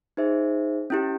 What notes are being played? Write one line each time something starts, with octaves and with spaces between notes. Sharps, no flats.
D#4 G#4 C5 E5
C#4 E4 G4